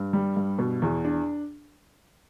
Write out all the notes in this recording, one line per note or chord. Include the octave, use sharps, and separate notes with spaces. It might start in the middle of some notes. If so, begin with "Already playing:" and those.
Already playing: G2
G3
G2
B2
E2
D4